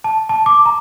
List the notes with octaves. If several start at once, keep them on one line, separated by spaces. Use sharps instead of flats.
A5
A5
D6
A#5